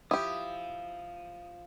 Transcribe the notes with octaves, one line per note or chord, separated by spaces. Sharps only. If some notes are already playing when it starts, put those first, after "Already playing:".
F3 E4 G4 D#6